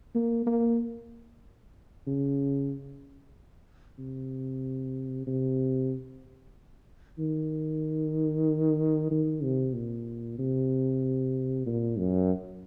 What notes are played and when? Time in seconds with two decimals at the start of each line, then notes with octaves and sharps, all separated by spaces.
0.15 A#3
0.47 A#3
2.07 C#3
3.99 C3
5.27 C3
7.19 D#3
9.11 D#3
9.43 C3
9.74 A#2
10.39 C3
11.66 A#2
11.98 F#2